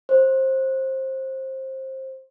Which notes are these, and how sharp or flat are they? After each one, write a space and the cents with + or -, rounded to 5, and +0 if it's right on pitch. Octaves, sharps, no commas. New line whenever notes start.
C5 +20